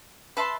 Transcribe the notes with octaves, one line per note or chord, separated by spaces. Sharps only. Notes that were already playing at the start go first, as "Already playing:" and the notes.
B4 E5 A5 C6